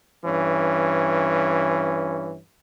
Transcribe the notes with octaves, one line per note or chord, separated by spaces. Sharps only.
G2 E3 C#4